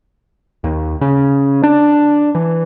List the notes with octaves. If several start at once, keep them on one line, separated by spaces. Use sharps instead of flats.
D#2
C#3
D4
E3